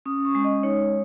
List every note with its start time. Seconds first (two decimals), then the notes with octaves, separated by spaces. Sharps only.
0.06 C#4 D#6
0.25 C#6
0.35 G#3
0.44 D#5
0.63 D#4 C#5